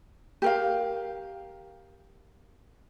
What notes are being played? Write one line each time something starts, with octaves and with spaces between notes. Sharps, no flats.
G4 A#4 F5